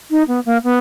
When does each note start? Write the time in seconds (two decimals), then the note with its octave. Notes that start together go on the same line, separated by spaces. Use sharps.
0.10 D#4
0.27 B3
0.45 A#3
0.63 B3